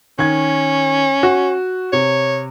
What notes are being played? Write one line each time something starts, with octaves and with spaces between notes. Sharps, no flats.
D#3 C#4 G#6
F#4
C3 C#5